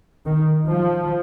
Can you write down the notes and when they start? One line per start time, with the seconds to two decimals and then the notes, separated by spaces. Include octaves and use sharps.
0.26 D#3
0.69 F3